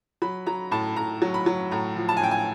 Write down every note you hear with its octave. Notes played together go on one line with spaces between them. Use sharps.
F#3 B5
F#3 A#5
A2 A5
A2 A#5
F#3
B5
F#3
A2 A#5
F3
A5
G#5
A2 G5
G#5